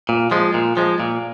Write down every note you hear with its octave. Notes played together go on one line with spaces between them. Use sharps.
A#2
F3 G#3
A#2
F3 G#3
A#2